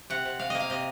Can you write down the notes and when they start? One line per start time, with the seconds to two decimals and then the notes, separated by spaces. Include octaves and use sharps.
0.10 C3 F#5
0.25 C3
0.39 C3 F5
0.50 A#3 D#5
0.60 F5
0.70 C3 D#5